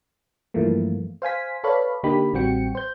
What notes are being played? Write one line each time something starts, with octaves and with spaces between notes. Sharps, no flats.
G2 E3 F3 A3 A#3
C5 F5 G#5 B6
A4 B4 C#5 D5 F5 B5
D3 A#3 D#4 G4 B5
A1 G3 C4 F#4 G5 C#7
C5 G6